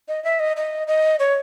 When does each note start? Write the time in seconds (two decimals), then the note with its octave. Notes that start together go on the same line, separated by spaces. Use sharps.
0.08 D#5
0.24 E5
0.40 D#5
0.57 D#5
0.88 D#5
1.19 C#5